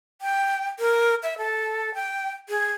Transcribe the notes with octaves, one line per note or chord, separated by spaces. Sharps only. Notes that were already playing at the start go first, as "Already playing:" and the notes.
G5
A#4
E5
A4
G5
G#4